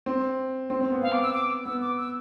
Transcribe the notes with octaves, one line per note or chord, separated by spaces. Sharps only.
C4
C4
C4
B3
B3 F5
D6
E6
D6
B3 E6
D6
E6